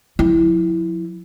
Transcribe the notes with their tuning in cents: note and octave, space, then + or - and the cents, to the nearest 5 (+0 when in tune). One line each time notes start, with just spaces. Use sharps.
F3 +40 E4 +0